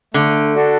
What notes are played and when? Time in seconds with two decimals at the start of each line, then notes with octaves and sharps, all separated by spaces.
0.14 D3 A3
0.55 D4 F#4 A4